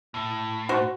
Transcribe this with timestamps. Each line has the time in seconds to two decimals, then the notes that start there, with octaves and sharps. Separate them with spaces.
0.14 A2
0.69 F#4 C5 C#5